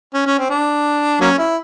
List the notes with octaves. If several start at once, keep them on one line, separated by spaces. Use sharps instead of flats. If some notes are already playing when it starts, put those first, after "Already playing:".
C#4
C#4
C4
D4
F#3 A#3 C#4
E4